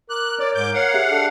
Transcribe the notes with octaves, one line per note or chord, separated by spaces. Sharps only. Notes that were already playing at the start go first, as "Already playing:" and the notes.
A#4 D6 F#6
C#5 D5
G#2 D6 G6
C#5 F5 F#5
G4 G#4 E5
D4 A4